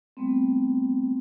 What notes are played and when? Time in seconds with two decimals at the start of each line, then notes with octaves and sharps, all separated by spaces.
0.17 G3 A3 B3 C4